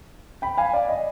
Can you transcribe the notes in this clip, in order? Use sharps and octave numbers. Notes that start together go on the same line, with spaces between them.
G5 B5
F5 G#5
D5 F5
D#5